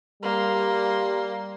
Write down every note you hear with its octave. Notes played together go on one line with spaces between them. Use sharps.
G3 A#3 C6